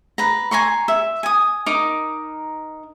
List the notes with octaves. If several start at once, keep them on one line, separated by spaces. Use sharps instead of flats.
B4 A#5
G#5 A#5 C6 C#6
E5
G#5 D#6
D#4 A#4 D6